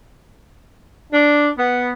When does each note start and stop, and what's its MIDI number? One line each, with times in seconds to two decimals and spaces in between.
1.12 1.50 62
1.57 1.92 59